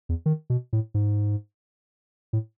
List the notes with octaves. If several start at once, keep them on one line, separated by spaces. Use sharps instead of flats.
E2
D#3
B2
A2
G#2
A2